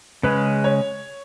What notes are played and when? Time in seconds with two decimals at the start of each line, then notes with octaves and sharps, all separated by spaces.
0.23 C#3 G#3 C#4 B4
0.64 C#5